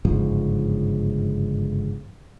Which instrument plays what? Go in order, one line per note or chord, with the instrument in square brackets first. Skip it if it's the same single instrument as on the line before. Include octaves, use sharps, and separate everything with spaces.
[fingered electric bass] G1 G#2 C#3 F3